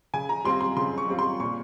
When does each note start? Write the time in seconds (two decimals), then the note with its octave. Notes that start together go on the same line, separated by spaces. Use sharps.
0.14 C#3 G#5
0.29 A#5
0.44 G3 C4 F4 C6
0.61 C6
0.77 C#3 C6
0.98 C#6
1.08 G3 C4 F4
1.19 C6
1.40 A#2 C#6